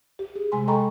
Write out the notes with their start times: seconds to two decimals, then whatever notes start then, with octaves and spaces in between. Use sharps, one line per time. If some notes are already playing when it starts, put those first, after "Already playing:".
0.19 G4
0.36 G#4
0.52 C3 G#3 G#5 C6
0.67 A4 D#5 G5 A#5 B5 C#6